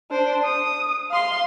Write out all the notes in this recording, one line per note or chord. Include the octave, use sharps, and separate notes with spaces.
D4 C5
D#6
F5 C6